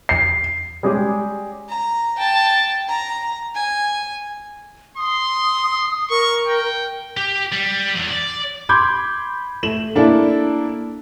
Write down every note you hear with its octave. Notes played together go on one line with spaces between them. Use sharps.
C7
G3 G#3 C#4 G4 G#4
A#5
G5 A5
A#5
G#5
C6 D#6
A#4 C#6
G5
G4
G3
E2
D5
B5 C6 D6 G6 G#6
A3 E7 F#7
A#3 D4 E4 A4